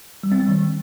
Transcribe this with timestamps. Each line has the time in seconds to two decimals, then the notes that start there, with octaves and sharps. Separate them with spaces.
0.23 G3
0.32 C4
0.40 G3
0.48 D#3